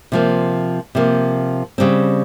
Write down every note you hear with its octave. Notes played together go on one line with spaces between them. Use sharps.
C3 F3 A#3
C3 F3 A#3
C#3 G3 C4